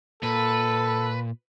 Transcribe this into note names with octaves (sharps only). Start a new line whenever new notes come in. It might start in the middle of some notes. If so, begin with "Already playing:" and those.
A#2 A4 B4